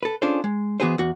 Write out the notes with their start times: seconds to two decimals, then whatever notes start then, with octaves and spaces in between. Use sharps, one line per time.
0.03 A4 B4
0.22 C#4 D4 F4 G#4 A4 C5
0.44 G#3
0.80 E3 B3 F#4 G#4 B4 C5
0.98 E2 F#4